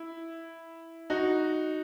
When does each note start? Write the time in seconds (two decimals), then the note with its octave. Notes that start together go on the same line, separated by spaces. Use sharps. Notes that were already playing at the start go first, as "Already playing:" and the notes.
Already playing: E4
1.10 D#4 F#4